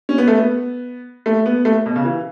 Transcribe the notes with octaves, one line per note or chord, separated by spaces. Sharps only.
C#4
B3
A3
B3
A3
B3
A3
B2
C#3
E3